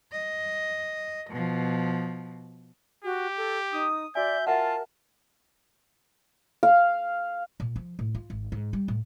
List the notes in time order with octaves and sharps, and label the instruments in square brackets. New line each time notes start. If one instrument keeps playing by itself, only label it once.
[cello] D#5
B2 F3
[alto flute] F#4 [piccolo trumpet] G4
[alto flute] A4
[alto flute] D#4 [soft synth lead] D#6
[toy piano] F#4 G#5 [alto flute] D5 [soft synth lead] E5 [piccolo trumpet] G6
[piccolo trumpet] F4 [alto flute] A#4 [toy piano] E5 F#5 [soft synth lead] A5
[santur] F5
[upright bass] A#2
F3
A2
F4
G#1
G#2
G3
A2